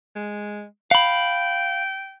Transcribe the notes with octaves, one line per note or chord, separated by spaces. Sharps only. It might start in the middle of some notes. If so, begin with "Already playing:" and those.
G#3
F5 G5 B5